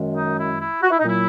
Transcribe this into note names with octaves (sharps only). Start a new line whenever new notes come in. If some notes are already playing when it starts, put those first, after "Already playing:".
Already playing: F#2 D#3 G#3
D#4
E4
E4
F#4
E4
D#4
A#2 F#3 E4